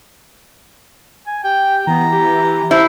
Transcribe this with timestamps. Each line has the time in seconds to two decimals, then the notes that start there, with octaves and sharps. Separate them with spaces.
1.27 G#5
1.44 G4 G5
1.87 E3 B3 A#5
2.12 G4
2.71 E4 C5